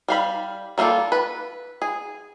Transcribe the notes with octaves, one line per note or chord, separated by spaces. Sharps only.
G3 F5 B5
G3 A#3 C4 F4 A4
B4
G#4